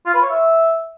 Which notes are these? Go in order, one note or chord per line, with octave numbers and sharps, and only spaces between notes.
F4
B4
C#5
E5